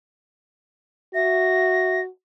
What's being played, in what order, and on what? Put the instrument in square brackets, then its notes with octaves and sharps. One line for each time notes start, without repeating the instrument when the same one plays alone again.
[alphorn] F#4 [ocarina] E5 [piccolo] A#6